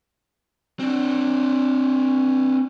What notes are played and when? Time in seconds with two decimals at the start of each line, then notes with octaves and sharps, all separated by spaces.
0.79 C4 D4